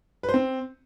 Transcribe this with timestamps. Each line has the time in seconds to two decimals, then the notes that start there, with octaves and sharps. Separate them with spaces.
0.23 B4
0.29 C5
0.34 C4